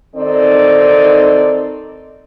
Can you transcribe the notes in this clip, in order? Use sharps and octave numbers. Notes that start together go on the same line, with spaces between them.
D#3 C4 D#4 A4 D5